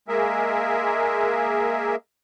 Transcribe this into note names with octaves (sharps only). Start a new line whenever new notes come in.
G#3 A#3 G#4 A#4 E5